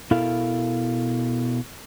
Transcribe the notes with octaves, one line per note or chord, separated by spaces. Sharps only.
B2 E4 A4 A#4 F5